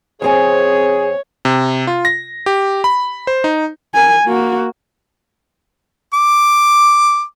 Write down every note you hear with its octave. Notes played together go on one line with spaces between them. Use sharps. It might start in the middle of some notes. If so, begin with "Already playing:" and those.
F2 C4 G#4 C#5 G#5
C3
F4
A#6
G4
B5
C5
D#4
A#4 G#5
A#3 F#4
D6